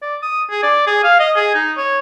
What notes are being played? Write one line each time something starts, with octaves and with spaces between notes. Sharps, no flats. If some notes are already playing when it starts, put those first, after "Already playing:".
D5
D#6
G#4
D5
G#4
F5
D#5
G#4
D#4
C#5